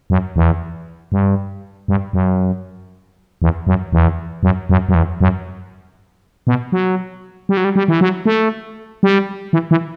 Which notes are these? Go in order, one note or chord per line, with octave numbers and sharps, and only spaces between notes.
F#2
E2
G2
G2
F#2
E2
F#2
E2
F#2
F#2
F#2
E2
F#2
B2
F#3
G3
F#3
G3
G3
E3
F#3
A3
G3
E3
E3